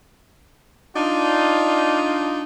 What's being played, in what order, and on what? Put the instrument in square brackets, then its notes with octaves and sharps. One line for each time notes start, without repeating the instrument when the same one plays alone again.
[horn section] D4 D#4 F4